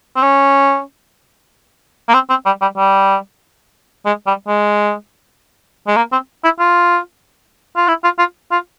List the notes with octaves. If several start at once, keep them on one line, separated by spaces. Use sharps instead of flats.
C4
C#4
A#3
C4
C4
G3
G3
G3
G#3
G3
G#3
G#3
A#3
C4
E4
F4
F4
E4
F4
F4
F4